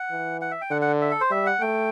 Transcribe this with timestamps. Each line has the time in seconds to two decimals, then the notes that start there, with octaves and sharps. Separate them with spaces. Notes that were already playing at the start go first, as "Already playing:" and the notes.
Already playing: F#5
0.11 E3
0.41 F#5
0.51 E5
0.61 G5
0.71 D3 F#5
0.82 F#5
1.01 E5
1.11 A4
1.21 C5
1.31 G3 E5
1.46 F#5
1.60 A3 G5